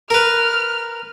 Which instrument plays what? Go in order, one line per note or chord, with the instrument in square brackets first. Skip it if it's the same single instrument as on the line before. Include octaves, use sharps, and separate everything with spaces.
[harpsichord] A#4 B4 [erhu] F6